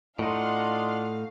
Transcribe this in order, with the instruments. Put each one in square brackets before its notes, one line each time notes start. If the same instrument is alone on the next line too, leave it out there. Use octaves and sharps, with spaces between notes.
[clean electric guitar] A2 D#4 [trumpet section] D4 F4 D#5 [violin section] F5 [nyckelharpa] F#5 C6